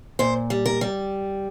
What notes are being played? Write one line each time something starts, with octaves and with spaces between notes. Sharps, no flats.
A#2 C5
G3
A#4
G3